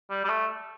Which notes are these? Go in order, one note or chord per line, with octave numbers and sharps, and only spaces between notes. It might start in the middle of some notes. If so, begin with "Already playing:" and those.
G3
G3
A3